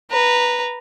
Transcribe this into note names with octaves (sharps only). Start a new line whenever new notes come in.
B4 A#5